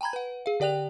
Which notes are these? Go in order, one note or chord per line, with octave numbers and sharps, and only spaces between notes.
G5 G#5 A#5 B5 G#6
B4 F#5
G#4 F5
D3 G4 D5 G5 F#6 F7